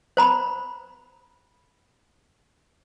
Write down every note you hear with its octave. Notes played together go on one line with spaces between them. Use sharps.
C5 A#5 B5